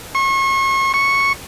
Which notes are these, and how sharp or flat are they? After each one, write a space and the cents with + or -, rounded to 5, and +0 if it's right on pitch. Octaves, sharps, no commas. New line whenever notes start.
C#6 -35
C#6 -5